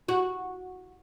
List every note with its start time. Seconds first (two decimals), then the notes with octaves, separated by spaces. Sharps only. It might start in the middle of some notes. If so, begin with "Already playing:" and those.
0.08 F#4